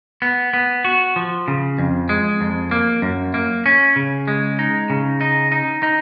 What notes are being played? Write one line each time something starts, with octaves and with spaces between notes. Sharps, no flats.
B3
B3
F#4
F3
C#3
F2
G#3
F2
A#3
F#2
A#3
C#4
C#3
G#3
D#4
C#3
D#4
D#4
D#4